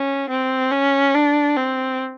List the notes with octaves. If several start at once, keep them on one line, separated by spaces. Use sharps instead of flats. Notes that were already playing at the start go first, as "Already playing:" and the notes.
Already playing: C#4
C4
C#4
D4
C4